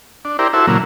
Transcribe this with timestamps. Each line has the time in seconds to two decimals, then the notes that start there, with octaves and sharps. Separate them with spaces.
0.25 D4
0.39 E4 G4 A#4 C5 D5
0.53 E4 F#4 A4 C5 E5
0.67 A#2 C#3 E3 F#3 A#3